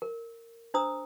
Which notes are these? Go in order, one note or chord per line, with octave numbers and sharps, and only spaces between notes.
A#4
D4 C5 A#5 D#6 E6